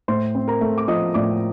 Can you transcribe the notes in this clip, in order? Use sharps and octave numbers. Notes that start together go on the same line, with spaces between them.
A2 C5 C6
C4
A#4 A#5
A3
D6
F3 D#5 D#6
A2 D5 D6